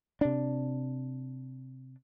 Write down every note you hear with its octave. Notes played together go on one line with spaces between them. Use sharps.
C3 D4